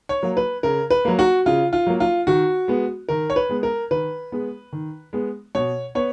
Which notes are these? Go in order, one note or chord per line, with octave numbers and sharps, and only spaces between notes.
C#5
F#3 A#3
B4
C#3 A#4
B4
F#3 A#3
F#4
C#3 F4
F4
F#3 A#3
F4
D#3 F#4
G#3 B3
D#3 A#4
C#5
B4
G#3 B3
A#4
D#3 B4
G#3 B3
D#3
G#3 B3
B2 C#5
B3 C#5